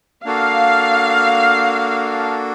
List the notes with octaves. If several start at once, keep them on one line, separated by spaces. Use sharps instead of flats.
A#3 D4 F#4 A4 F5